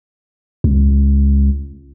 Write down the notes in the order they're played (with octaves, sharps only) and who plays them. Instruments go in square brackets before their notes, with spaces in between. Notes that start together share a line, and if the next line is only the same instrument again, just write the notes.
[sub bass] C#2